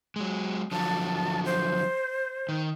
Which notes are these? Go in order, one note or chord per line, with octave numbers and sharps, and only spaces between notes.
F#3 G#3
D3 F3 F#3 A5
C5
D#3